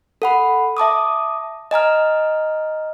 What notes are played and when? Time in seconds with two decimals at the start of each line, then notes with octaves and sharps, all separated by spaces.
0.22 A4 F#5 B5
0.77 E5 A5 D6 D#6
1.71 D#5 G#5 A#5 F6